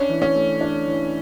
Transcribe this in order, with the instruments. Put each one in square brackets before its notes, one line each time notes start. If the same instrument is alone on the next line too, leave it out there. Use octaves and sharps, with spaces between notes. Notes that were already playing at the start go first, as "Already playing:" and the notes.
Already playing: [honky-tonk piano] C#4 [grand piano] D4
[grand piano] E3
[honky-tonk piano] C#4
[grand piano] A3
D4
E3